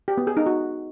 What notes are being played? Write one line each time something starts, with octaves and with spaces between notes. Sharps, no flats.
G4
B3
G#4
D#4
F#4